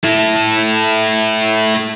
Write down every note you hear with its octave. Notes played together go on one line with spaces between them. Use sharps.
E4 A4